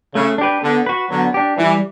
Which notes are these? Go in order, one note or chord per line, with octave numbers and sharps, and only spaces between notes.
C#3 A3
D4 G4 B4
D3 B3
F#4 B4
D3 F#3 B3
D4 G4
E3 G3